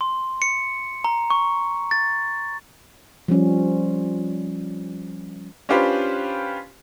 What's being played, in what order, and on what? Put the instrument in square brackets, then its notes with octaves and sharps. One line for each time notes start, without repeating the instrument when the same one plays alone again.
[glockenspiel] C6
C#7
A#5
C#6
A6
[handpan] F3 G3 C#4
[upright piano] C#4 D4 F4 G4 B4 C5